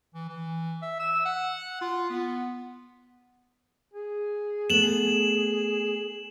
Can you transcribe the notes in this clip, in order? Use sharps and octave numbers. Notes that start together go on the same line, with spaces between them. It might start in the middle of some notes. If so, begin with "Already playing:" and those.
E3
E3
E5
E6
F#5
F4
B3
G#4
A3 B3 E7 F#7